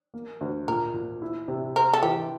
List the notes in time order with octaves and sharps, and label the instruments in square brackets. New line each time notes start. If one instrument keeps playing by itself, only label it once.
[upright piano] A#3
D2
[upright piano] A#2 [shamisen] A#4
[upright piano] A#2
E4
C3
[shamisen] A#4 [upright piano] C5
[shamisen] A4
[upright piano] E3 [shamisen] G4